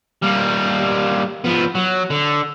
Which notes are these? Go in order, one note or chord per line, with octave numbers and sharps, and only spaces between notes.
G3 A#3
F3 B3
F#3
D3